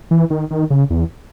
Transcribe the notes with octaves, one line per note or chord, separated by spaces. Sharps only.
E3
D#3
D#3
C#3
E2